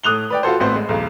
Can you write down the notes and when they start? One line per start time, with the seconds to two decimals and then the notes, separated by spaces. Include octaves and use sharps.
0.03 A2 D#6 F#6 F7 G7
0.30 B4 D5 G5
0.43 F4 F#4 A4 C5
0.60 A1 B3 C4 C5
0.75 G#3
0.89 B1 E2